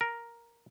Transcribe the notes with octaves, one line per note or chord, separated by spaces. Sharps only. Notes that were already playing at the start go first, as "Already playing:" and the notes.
A#4